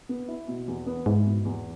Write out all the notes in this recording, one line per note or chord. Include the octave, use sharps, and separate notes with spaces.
B3
E4
B2
E2
B3
G#2 E4
B2
E2